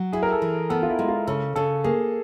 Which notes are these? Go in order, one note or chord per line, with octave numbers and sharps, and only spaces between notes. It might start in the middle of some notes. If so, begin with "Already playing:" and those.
Already playing: F#3
E4 G#4
A#4
A4
E3
B3 A4
F4
E4
G#3
F4
C#3 A4
C#3 A4
A#3 G#4